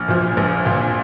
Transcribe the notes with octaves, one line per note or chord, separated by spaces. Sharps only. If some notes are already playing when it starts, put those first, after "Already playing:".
Already playing: A#1 F6
A#2 F3
A#1
A#2 F3